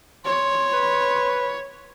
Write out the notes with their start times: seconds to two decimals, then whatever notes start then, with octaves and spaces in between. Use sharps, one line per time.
0.25 C#5 C6
0.73 B4